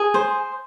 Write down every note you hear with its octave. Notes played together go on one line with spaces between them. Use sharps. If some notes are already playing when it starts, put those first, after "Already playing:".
Already playing: G#4
C5